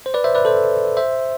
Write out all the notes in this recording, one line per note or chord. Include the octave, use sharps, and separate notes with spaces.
C5
B4 D5
C5 E5
B4 D5
A4 C5
C5 E5